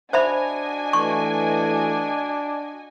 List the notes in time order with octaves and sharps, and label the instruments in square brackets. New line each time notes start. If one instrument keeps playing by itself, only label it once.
[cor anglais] D4 [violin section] F#4 D#5 G#5 [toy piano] C5 E5 B5
[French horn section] E3 A3 [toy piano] C#6